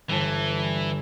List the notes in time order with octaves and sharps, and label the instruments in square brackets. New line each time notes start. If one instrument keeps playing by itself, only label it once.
[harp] G1 A5 [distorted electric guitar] E3